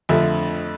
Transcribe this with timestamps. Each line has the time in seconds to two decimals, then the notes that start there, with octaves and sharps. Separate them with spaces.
0.09 F2 D3 F3 A3 E5